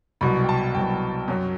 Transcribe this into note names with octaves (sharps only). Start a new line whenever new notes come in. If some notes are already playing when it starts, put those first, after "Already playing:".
C2 B2 F#3 B5
G5
A5
C2 B2 F#3 G5
F#2 F#3